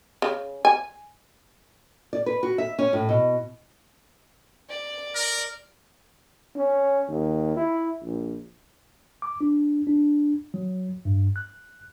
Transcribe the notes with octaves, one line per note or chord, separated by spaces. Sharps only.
C#3
G#5
D5
B4
F#4
E5
C#4
A2
B2
D5
A#4
C#4
D#2
E4
A#1
D6
D4
D4
F#3
G2
F#6